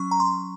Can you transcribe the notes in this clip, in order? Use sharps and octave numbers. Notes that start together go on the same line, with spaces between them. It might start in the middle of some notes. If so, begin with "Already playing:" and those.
Already playing: F#3 C#4 C#6
A#5
C6